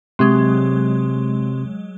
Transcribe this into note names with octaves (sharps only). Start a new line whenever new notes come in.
C3 F#3 G#3 C6